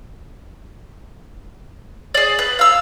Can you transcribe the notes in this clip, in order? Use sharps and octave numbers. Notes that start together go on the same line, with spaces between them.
G#4 D5
B4
F5 E6